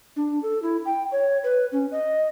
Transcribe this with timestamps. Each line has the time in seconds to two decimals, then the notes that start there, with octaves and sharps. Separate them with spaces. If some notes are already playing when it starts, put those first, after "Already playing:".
0.16 D4
0.43 A4
0.62 E4
0.85 G5
1.12 C#5
1.44 B4
1.72 C#4
1.92 D#5